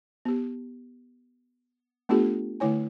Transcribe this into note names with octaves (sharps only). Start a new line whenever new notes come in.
B3 G4
A3 B3 D4 F4 G4 A4
D3 A3 E4 C#5 G#5